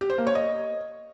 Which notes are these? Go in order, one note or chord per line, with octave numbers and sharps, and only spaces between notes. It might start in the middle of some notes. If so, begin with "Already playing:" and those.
G4
C5
A#3
C#5
D#5